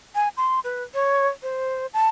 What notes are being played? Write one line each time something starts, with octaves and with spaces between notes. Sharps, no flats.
G#5
C6
B4
C#5
C5
A5